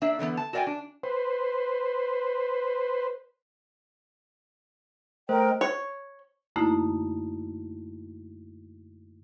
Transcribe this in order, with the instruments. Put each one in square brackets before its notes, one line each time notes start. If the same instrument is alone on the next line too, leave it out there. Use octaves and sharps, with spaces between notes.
[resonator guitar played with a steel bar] A#3 D4 E5
D3 E3 A#3 B3
A5
F#4 A#4 D5 E5 G5 G#5
D4
[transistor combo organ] B4 C5
[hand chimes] A3 C5 [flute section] A#4 D#5 G5
[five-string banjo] C#5
[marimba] F#2 D3 A3 A#3 D#4 E4